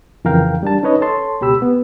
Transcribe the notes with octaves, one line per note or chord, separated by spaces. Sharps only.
F2 C#3 E3 A#4 F5 G5
G3 D4 A5
C#4 D#4 B4 C#5 D#5
A4 C#5 A5 C6
C#2 B2 G4 B5 E6
B3